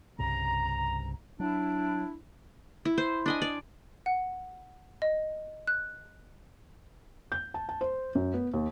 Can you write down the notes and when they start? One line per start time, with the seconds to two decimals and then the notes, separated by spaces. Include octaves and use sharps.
0.19 C2 G2 C#3 A#5
1.40 F#3 D4 E4
2.85 E4
2.98 C5
3.26 D4 D#5 G#5
3.42 D5
4.06 F#5
5.02 D#5
5.67 F#6
7.32 G6
7.54 A5
7.69 A5
7.81 C5
8.15 F#2
8.34 B3
8.53 D#2